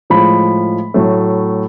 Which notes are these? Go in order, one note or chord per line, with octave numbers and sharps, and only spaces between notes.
A2 F3 G#3 B5
A2 F#3 A3